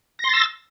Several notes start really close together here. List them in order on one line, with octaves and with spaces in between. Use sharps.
A#6 C6 A6 E6